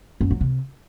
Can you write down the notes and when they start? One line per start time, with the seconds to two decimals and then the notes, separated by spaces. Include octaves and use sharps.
0.21 F#2
0.31 F#3
0.41 C3